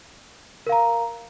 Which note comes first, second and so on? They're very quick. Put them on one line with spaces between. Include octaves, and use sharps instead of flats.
A#4 F5 A#5